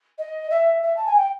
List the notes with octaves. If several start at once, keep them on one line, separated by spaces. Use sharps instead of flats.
D#5
E5
E5
A5
G#5
G5